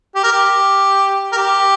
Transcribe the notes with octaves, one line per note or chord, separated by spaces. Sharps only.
G4
A#4
G4
A#4
G4